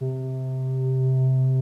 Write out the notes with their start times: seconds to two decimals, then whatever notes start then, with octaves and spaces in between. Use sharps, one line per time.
0.01 C3